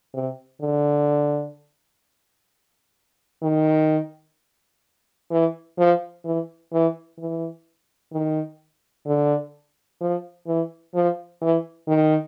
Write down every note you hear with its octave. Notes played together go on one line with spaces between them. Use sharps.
C3
D3
D#3
E3
F3
E3
E3
E3
D#3
D3
F3
E3
F3
E3
D#3